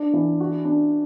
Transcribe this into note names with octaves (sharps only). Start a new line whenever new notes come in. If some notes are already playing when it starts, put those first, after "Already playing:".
Already playing: D4
E3
F#4
D4